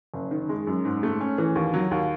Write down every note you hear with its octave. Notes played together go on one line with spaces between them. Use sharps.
F#1
D#3
G#3
F#2
G#2
A3
C#4
E3
D#2
F#3
D#2